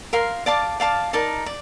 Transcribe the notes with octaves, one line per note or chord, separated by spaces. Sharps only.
A#4 F5 C6
D5 F5 A5 D6
D5 F5 A5 D6
D#4 A#4 D5 A5
D5